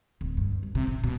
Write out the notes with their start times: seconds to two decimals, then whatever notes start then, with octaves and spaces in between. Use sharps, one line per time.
0.21 D1
0.37 G2
0.63 G2
0.75 C3
0.87 A1
1.04 B2